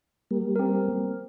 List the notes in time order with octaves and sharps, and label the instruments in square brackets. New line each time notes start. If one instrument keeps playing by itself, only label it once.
[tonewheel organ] G3 A#3
[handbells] C4 A#4